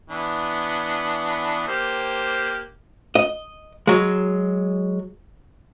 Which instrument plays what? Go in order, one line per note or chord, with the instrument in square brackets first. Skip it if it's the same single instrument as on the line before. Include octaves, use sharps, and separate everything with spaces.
[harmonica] E3 B3 D4
A#3 G4 C5
[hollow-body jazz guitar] D#5
F#3 G#3